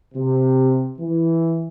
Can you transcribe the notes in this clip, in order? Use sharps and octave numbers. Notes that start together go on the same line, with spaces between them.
C3
E3